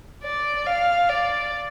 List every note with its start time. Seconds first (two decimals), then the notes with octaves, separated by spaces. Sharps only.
0.24 D5
0.66 F5
1.09 D5